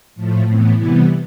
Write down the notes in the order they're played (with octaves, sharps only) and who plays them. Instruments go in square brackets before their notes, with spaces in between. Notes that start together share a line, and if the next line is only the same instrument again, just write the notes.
[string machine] A2 F3 A3
A2 E3 B3 C4
C3 E3 G3 B3 E4